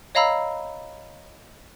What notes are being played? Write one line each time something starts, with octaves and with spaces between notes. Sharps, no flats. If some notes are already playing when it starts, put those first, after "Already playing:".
C#5 D#5 F5 A#5 B5 E6